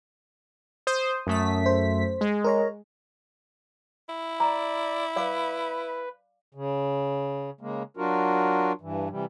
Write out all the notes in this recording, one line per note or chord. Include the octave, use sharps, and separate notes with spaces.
C5 D#6
F#2 A3 B6
C5
G#3
A#4 C#5 A#5
E4
D5 A#5
B4 D5 F5 D6
C#3
C#3 G#3 A#3
F#3 D4 F4 F#4 A#4
G2 E3
C3 E3 G3